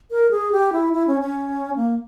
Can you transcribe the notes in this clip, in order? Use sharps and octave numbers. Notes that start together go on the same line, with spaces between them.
A#4
G#4
G4
E4
E4
C#4
C#4
A#3